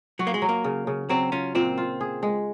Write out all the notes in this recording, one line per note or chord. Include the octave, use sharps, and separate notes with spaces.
F#3 F#4
A#3
G#3
F#3
A#3
C#3
C#3
F#3 C4
C#4 F4
A#2 C4
F4
G#4
G#3